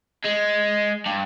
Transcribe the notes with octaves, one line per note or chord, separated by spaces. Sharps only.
G#3
G2